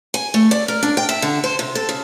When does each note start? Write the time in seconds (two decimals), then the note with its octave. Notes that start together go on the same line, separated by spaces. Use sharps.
0.14 G#5
0.34 A3
0.51 D5
0.68 A#4
0.83 D4
0.97 G5
1.09 E5
1.22 D3
1.44 C5
1.59 C3
1.75 A4
1.89 C#3